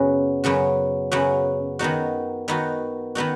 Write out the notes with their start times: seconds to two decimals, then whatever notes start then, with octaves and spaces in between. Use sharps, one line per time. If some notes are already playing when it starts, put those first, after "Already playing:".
Already playing: F#2 C#3 B3 F#4
0.44 F#2 C#3 B3 F#4
1.11 F#2 C#3 B3 F#4
1.79 D#3 B3 D#4 F#4
2.48 D#3 B3 D#4 F#4
3.15 D#3 B3 D#4 F#4